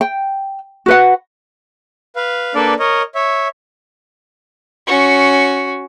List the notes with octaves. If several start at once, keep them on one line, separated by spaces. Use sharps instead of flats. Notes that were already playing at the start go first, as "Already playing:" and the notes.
G5
F#4 B4 F#5
B4 F5
A#3 D4 A4 B4 D5
A#4 C#5 D#5
C#5 E5
C#4 F#4